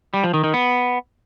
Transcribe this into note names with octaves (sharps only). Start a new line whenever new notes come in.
G3
F3
D#3
D#3
B3